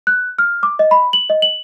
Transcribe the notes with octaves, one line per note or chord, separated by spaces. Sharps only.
F#6
F6
D6
D#5
B5
F#7
D#5
F#7